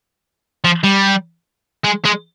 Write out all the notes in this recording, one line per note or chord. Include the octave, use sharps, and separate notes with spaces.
F3
G3
G#3
G#3